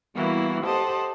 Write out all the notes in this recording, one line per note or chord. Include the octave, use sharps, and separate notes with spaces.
E3 G3 A#3 B3 E4 F#4
G4 A4 C5 D#5 F#5 A5